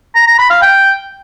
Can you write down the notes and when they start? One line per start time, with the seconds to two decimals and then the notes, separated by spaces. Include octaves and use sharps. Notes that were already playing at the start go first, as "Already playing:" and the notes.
0.15 A#5
0.27 A#5
0.39 B5
0.50 F5
0.62 G5